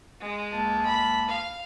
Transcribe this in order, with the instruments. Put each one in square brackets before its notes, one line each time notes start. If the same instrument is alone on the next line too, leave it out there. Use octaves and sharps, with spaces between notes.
[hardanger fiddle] G#3
[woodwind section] C#2 A#3 A5
[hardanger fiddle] B5
F5